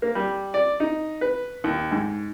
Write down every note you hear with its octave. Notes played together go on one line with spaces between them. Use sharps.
A#3
G3
D5
D#4
B4
D#2
G#2